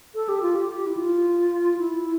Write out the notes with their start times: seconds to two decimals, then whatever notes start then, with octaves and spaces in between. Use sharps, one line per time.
0.15 A4
0.29 G4
0.42 F4
0.55 G4
0.87 E4
0.97 F4
1.78 E4